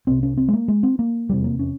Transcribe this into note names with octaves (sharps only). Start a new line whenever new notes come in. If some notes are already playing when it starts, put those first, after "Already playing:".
C2 C3 C4
C#4
C4
G#3
A#3
G#3
C4
A#3
F1 E2 C3 G3
A#3
C#4